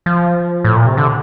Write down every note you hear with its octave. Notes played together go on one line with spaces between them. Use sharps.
F3
A2
A#2
C3
D3